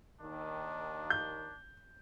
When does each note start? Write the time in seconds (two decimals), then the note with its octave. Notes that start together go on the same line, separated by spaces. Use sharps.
0.21 D#2 D#3 D4
1.10 G6